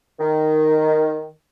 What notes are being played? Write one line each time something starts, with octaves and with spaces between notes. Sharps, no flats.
D#3